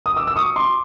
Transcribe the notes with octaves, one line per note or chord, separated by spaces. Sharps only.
D#6
D6 E6
E6
C#6 D#6
C6 D6